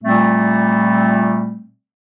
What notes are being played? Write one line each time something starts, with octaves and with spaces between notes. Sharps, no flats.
A#2 G3 A3 C4